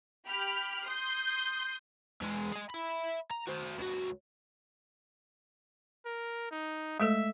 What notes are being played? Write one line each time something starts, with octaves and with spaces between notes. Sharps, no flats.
G4 B5 F6
C6 D#6 G6
E2 G#3
G#4 D#5
E5 B5
A#5
F#4 C5
C#2 F#4
A#4
D#4
G#3 A3 A4 E5